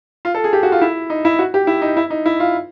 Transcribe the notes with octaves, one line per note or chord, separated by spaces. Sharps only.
F4
A4
G#4
G4
F#4
F4
E4
D#4
E4
F#4
G4
E4
D#4
E4
D#4
E4
F4